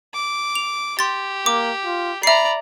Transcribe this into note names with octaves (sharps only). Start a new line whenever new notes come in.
D6
F7
G4 C6 A6
A#3 D6
F4
D5 E5 A#5 B5 C7